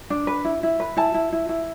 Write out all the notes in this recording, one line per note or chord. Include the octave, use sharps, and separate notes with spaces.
D4
B4
E4
E4
B4
E4 A5
E4
E4
E4